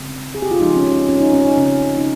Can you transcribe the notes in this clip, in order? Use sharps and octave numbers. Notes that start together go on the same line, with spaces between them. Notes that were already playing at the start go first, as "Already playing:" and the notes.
Already playing: C#3 G#3 C4
G#4
G4
F4
C#3 F3 G#3 D#4
C#4
C#4
C#4
D#4
C#4
D#4
C#3 G#3 C4 C#4
D#4